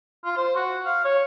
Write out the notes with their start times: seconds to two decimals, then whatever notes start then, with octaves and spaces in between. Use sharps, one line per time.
0.25 F4
0.37 C5
0.56 F#4
0.86 F5
1.05 C#5